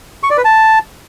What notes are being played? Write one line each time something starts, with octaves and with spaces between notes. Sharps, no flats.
C#6
D5
B4
A5